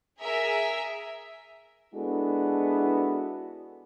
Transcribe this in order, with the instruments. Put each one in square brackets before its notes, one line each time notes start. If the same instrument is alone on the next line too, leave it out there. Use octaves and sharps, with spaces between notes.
[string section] G#4 A#4 E5
[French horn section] G#3 B3 D4 E4 F#4 A4